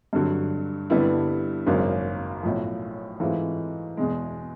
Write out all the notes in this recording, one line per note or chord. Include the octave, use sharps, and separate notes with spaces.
G2 D3 F#3
G2 D3 G3 B3 E4
G#1 F#2 C#3 F#3 A#3
B1 A2 F3
G#2 E3 A3 C4 F4
E2 B2 G#3